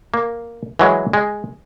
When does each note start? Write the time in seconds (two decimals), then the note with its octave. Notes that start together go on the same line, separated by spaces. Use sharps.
0.14 A#3
0.79 E3 F#3 G#3
1.13 G#3